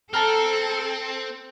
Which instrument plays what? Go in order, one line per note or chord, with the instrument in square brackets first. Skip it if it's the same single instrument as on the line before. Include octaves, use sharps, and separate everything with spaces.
[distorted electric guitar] C4 [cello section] A4 [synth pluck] A5 A#5 F6